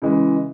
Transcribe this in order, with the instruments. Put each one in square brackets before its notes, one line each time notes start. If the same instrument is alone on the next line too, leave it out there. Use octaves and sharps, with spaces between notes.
[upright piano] C#3 E3 G#3